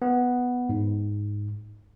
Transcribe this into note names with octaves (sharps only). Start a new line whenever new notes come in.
B3
G#2